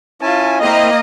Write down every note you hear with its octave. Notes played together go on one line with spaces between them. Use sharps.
C#4 E4 F4 G#5 A5
A#3 C4 E4 D#5 A#5